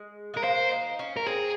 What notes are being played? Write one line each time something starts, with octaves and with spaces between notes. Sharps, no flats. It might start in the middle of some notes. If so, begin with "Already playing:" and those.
Already playing: G#3
G#3 A#4
A#3 C5
D#4
C#4
A#4
C4 G#4